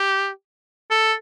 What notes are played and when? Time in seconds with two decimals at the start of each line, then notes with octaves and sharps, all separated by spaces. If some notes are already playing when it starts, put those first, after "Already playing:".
Already playing: G4
0.90 A4